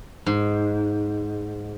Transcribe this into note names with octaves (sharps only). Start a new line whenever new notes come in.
G#2